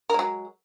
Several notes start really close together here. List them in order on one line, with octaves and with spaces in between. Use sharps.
A#4 G#3 F#3